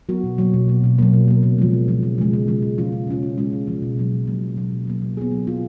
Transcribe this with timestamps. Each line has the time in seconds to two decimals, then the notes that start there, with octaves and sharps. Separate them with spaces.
0.09 F#3 B3 F#4 A#4
0.24 B2
0.38 F#3 A#3
0.54 B2
0.68 F#3 A#3
0.84 B2
0.98 F#3 A#3
1.13 B2
1.28 F#3 A#3
1.43 C#3
1.58 F3 G#3
1.73 C#3
1.88 F3 G#3
2.03 C#3
2.18 F3 G#3
2.33 C#3
2.48 F3 G#3
2.62 C#3
2.78 F3 G#3 C#4 F4
2.92 C#3
3.07 F3 G#3 C#4 F4
3.23 C#3
3.37 F3 G#3 C#4 F4
3.53 C#3
3.67 F3 G#3 C#4 F4
3.82 B2
3.98 F#3 A#3
4.12 B2
4.27 F#3 A#3
4.42 B2
4.57 F#3 A#3
4.72 B2
4.87 F#3 A#3
5.02 F#3
5.17 B3 F4 G#4
5.32 F#3
5.47 B3 F4 G#4